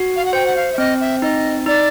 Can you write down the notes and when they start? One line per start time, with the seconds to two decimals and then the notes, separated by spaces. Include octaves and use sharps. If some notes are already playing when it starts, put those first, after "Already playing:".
Already playing: F#4
0.15 F5
0.25 F#5
0.33 C5 G5
0.45 F#5
0.55 F5
0.72 E5
0.78 C4 D#5
1.00 E5
1.22 D#4 D#5
1.66 D#4 D5